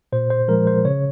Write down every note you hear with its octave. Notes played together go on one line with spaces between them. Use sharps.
A#2 C5
C5
F3 G#3 A#4
C5
C#3 C#5